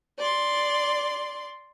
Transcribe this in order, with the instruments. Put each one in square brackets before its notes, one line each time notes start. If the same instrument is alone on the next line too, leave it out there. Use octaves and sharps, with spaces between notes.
[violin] D5 C6